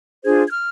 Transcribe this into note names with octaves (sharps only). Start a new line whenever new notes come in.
D4 F4 G#4 C5 G#6
G#6
F6